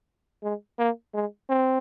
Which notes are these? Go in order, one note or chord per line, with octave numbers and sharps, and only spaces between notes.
G#3
A#3
G#3
C4